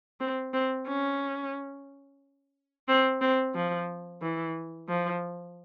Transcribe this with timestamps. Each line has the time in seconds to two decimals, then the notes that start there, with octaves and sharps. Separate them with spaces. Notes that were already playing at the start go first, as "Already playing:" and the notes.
0.20 C4
0.53 C4
0.88 C#4
2.88 C4
3.21 C4
3.55 F3
4.22 E3
4.89 F3